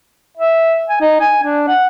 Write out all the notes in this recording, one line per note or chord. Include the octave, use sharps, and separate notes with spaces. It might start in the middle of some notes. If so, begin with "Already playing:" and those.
E5
G#5
D#4
G#5
D4
F#5